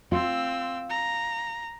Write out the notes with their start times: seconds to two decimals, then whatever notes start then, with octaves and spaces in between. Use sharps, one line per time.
0.12 C4 F4 E6
0.90 A#5